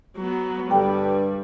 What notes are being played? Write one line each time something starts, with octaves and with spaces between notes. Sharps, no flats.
F#3 B3
G2 D3 G3 A4 B4 G5